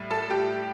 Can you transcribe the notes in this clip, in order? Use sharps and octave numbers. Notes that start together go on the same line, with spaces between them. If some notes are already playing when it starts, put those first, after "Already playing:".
Already playing: A2 G3
A4 A5
G4 G5